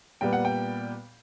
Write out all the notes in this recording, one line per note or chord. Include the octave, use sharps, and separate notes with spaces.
A#2 G3 B3 G5
F#5
G5